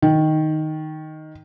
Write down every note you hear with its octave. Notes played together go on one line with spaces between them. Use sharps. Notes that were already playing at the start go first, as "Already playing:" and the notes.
D#3